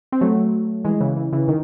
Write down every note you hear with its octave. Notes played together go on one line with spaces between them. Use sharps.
C4
F#3 A3
E3 G#3
C#3 E3
C#3 E3
C#3 E3
D#3